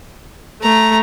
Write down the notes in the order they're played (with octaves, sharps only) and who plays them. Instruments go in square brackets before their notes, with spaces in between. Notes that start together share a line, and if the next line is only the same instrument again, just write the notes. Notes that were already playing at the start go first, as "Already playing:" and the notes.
[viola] A3 [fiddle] A#5